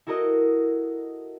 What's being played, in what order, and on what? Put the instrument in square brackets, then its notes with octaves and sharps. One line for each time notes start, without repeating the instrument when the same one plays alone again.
[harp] E4 F#4 A4 A#4 D#5